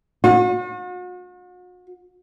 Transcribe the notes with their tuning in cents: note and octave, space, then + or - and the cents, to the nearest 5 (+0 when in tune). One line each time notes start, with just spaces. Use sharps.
F#4 -45